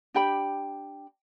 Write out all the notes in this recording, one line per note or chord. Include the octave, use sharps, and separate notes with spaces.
D4 G4 G5 B5